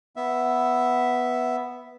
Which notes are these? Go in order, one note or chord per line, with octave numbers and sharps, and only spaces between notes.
B3 E5